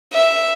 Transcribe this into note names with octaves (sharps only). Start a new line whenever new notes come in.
E5